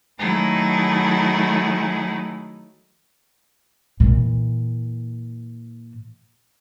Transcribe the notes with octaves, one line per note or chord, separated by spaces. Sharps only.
D#3 F#3 A3 D#4 E4 G#4
A#2 E3